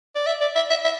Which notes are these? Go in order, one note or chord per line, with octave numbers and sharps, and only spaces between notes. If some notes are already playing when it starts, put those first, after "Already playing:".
D5
E5
D5
E5
E5
E5